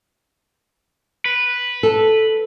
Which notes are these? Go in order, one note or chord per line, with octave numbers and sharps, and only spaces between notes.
B4
A4